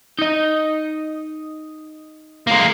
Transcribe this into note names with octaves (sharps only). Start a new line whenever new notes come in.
D#4 D#5
G#3 A#3